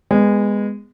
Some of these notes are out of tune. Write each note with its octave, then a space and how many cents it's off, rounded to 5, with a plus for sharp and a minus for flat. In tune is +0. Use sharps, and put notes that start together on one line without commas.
G#3 -20 B3 +0